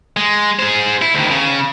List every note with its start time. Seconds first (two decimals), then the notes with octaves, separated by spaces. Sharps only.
0.17 G#3
0.59 G#4 C5
1.02 E4
1.14 D2 D#3
1.31 C#3